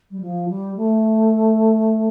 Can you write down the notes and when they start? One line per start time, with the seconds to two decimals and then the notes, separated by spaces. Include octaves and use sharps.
0.11 G3
0.21 F3
0.49 G3
0.76 A3